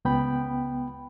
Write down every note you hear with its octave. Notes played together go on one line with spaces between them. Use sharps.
C#2 B3 G5 B5